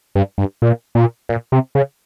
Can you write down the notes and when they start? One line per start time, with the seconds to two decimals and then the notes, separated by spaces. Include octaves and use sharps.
0.15 G2
0.38 G2
0.62 A#2
0.95 A#2
1.29 A#2
1.52 C3
1.75 C#3